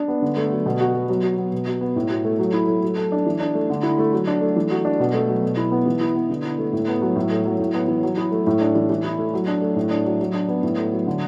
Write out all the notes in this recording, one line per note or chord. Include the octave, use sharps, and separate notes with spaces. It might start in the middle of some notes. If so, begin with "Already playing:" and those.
Already playing: D4
B3
D3
A3
F#3
B2
F#4
B3
F#3
F#4
B3
B2
F#4
B3
A2
F#4
A3
F#3
E4
A3
F#3
A4
D4
E3
D4
A3
D3
E4
A3
F#3
D4
A3
E3
F#4
D4
B2
A3
F#3
B2
E4
B3
E3
E4
B3
D3
E4
A3
A2
B3
F#3
A2
A3
F#3
A2
B3
E3
F#3
E4
A3
A2
D4
E3
E3
E4
A3
F#3
D4
A3
A2
D4
F#3
F#3
D4
B3
A2
A3
F#3
D3